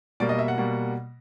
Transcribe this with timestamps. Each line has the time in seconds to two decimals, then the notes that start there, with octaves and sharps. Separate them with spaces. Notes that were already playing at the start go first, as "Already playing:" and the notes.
0.20 B2 G3 A#3 D5
0.29 D#5
0.39 E5
0.48 F#5
0.58 B2 G3 A#3